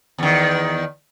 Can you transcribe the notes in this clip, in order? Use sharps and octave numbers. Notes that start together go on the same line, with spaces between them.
E2 D#3